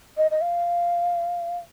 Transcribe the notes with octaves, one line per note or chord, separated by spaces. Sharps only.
D#5
D#5
F5